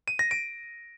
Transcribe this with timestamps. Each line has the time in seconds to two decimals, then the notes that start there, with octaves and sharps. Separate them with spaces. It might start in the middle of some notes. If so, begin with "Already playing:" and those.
0.08 D#7
0.19 A#6
0.31 D7